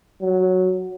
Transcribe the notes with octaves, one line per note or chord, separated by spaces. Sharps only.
F#3